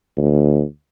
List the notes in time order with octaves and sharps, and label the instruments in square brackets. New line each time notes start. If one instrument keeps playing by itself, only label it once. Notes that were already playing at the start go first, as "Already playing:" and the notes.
[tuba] D2